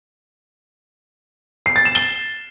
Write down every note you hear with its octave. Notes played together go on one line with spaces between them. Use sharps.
C7
A6
E7
G7